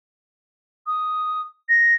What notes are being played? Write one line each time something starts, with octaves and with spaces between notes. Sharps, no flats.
D#6
A#6